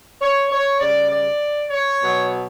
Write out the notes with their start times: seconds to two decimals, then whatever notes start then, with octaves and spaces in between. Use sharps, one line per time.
0.20 C#5
0.50 C#5
0.80 C#3 G3 D5
1.10 D5
1.70 C#5
2.01 B2 F#3